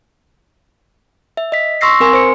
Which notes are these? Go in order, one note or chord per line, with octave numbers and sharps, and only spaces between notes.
E5
D#5 B6
C6 C#6 E6 A#6 C7
C4 A#4 G#5 C6
C5 C#7